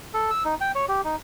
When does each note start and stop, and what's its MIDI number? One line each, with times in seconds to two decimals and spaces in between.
0.14 0.30 69
0.31 0.44 88
0.45 0.55 63
0.61 0.72 79
0.75 0.86 73
0.89 1.01 67
1.05 1.16 63